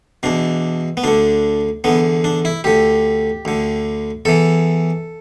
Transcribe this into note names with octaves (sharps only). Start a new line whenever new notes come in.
E2 B2 D4
B3
D2 D3 D4
E2 D3 B3
D4
E4
D2 D3 G4
D2 D3
E2 E3 A4